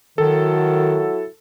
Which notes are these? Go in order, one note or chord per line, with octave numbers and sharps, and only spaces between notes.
D#3 F#3 E4 F#4 A4